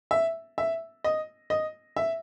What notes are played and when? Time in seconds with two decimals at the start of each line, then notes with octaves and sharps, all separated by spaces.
0.11 E5
0.58 E5
1.04 D#5
1.50 D#5
1.96 E5